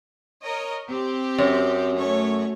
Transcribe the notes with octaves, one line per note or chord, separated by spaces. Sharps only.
A#4 C#5 D#5
C4 G4
F#2
A3 C#4 C#5